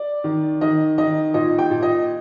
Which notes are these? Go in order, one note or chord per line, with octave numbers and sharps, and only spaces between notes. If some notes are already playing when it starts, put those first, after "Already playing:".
Already playing: D5
D#3
D#3 D#5
D#3 D#5
A#2 D#5
G5
A#2
D#5